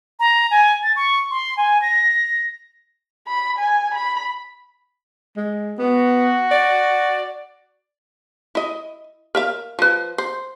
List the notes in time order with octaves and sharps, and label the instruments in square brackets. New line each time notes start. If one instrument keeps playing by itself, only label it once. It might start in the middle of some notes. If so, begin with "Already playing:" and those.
[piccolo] A#5
G#5
A6
C#6
C6
G#5
A#6
[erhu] B5
G#5
B5
[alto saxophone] G#3
[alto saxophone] B3 [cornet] F#4
[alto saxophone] D5
[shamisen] E4 D#5
A#4 E5 F5
F3 B4
C5